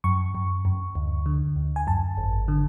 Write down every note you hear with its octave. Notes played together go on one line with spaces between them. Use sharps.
F#2 C#6
F#2
F#2
D2
D3
D2
G#5
F#2 A5
G#1
D3